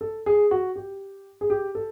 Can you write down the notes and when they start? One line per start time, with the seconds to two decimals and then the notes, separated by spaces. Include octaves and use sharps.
0.01 A4
0.26 G#4
0.51 F#4
0.76 G4
1.41 G#4
1.50 G4
1.75 A4